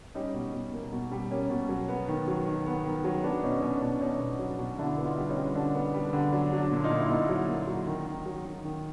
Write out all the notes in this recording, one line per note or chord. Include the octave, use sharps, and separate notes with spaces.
G3 C#4 D#4
B2
B2
A#3
B2
G3
A#3 C#4
B2
F#3
B3
D#3
F#3
D#3
B3
D#3
F#3
B3 D4
B2 C#4 D#4
B2 C#4
B2 D4
B2 C#4 D#4
B2
F#3
B2
D3 D4 E4
B3
D#4 F4
G3
C#4 D#4
G3
D3 D4
B3
G3
D3
F#3 D4
F#3
D4
A#2
D#4 F4
A#2
E4
A#2 D#4 F4
F#3
A#2
F#3
D#3
D#3
F#3
D#3
D#3